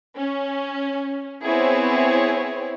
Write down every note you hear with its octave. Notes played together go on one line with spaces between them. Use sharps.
C#4
B3 C4 E4 G#4 C#5